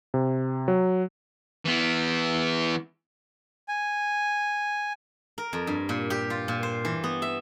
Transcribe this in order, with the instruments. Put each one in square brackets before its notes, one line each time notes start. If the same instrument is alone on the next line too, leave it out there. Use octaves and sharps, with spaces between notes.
[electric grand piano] C3
F#3
[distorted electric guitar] E3 B3
[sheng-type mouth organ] G#5
[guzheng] A#4
F2
G2
A#2
G4
F4
A#2
C5
E3
B3
E5